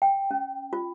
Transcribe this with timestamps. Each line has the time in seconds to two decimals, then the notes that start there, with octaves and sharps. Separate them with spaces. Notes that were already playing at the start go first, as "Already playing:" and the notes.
0.02 G5
0.31 C#4
0.73 F4